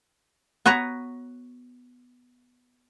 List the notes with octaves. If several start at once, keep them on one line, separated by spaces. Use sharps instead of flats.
B3 F#4 B4 C#5 A#5